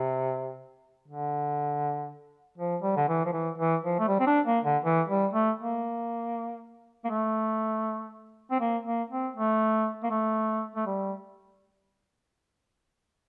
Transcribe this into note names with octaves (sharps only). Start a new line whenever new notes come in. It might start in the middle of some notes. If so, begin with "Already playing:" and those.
Already playing: C3
D3
F3
G3
D3
E3
F3
E3
E3
F3
A3
G3
C4
D4
A#3
D3
E3
G3
A3
A#3
A#3
A3
C4
A#3
A#3
C4
A3
A#3
A3
A3
G3